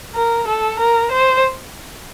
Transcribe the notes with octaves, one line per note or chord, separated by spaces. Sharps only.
A#4
A4
A#4
C5